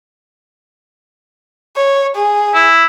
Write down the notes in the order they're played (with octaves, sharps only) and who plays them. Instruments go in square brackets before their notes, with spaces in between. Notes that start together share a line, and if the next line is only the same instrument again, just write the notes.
[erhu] C#5
G#4
[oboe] E4